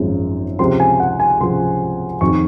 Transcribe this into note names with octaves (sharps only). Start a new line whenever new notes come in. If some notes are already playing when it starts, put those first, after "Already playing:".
Already playing: G#1 F#2 F3 G#3
C#2 C3 F3 C4 C6
G#5
F#5
G#5
C#2 C3 F3 C4 C6
F2 D#3 F#3 C#6